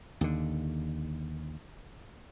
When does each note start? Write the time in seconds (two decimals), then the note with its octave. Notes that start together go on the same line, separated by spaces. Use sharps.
0.21 D#2 D3